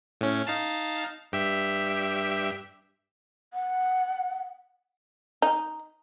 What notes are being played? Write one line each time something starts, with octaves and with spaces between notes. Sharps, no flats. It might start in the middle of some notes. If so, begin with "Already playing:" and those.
A2 C#4
D#4 F5 A5
G2 G4 E5
F#5
D#4